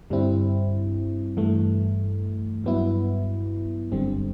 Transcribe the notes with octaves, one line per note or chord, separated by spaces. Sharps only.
G2 D3 G3 C4 E4
G2 E3 A3
G2 F#3 B3 E4
G1 F#2 D3 G3 C4